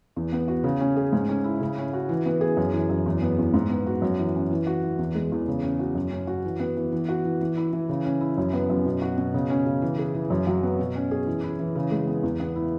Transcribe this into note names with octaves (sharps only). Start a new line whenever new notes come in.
E2
B3
F#4
C#3
C#4
G#4
G#2
C#4
E4
C#3
C#4
F#4
E3
B3
G#4
F#2
E3
F#2
E2
B3
E2
G#2
B3
F#4
F#2
E3
C#4
E3
F#4
E3
E2
G#3
E2
C#3
C#4
F#4
F#2
C#4
F#4
E3
B3
E3
E3
F#4
E3
E3
E4
E3
C#3
C#4
E4
F#2
B3
F#2
B2
F#4
B2
C#3
C#4
C#3
E3
G#4
E3
F#2
F#3
B3
B2
C#4
G#4
E3
E4
E3
C#3
G#3
B3
E2
B3
E4